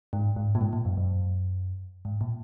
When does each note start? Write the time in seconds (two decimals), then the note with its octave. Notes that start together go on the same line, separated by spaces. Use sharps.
0.13 G#2
0.36 G#2
0.55 A#2
0.61 G#2
0.73 A#2
0.85 F#2
0.97 F#2
2.05 G#2
2.21 A#2